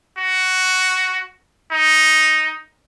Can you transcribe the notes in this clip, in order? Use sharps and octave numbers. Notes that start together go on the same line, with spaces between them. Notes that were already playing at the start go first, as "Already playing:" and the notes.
F#4
D#4